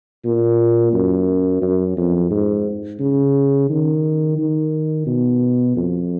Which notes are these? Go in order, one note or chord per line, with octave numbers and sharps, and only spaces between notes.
A#2
F#2
F#2
F2
G#2
C#3
D#3
D#3
B2
F2